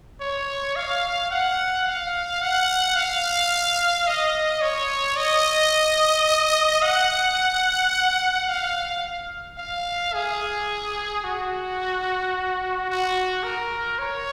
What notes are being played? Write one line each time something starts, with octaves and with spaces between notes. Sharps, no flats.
C#5
F5
F#5
F5
F#5
F5
D#5
C#5
D#5
F#5
F5
F5
G#4
F#4
F#4
A#4
C#5